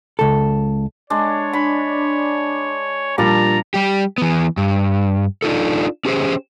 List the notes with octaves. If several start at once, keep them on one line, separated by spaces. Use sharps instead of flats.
C#2 A4
G#3 D4 C#5
D4 B5
A#2 F3 G3 D4 A5 A#5
G3 G4
E3 B3
G2
D4 D#4 F4 A4
C#4 G4 G#4 C5